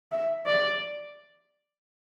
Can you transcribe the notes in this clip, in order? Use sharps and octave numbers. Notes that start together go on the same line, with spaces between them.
E5
D5